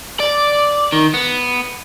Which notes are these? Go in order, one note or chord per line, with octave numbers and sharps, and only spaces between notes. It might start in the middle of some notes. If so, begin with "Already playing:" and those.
D5
D#3
B3